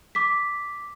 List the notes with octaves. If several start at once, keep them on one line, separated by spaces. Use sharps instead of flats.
D6 B6